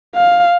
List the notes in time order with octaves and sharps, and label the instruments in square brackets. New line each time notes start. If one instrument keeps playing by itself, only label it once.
[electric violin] F5